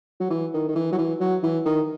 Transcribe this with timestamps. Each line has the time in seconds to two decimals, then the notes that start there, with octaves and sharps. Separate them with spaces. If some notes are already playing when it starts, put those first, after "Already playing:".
0.20 F#3
0.31 E3
0.54 D#3
0.69 D#3
0.76 E3
0.93 F#3
0.98 E3
1.21 F#3
1.43 E3
1.65 D#3